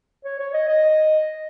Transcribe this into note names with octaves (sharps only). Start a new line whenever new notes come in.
C#5
C#5
D#5
D#5